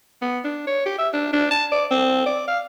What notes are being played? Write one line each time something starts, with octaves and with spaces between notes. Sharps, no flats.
B3
D4
C#5
G4
E5
D4
D4
A5
D5
C4
D5
F5